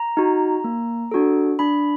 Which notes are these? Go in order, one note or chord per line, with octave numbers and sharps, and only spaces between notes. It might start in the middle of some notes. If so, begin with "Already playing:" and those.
Already playing: A#5
D#4 F#4
A#3
D4 F#4 A4
D4 B5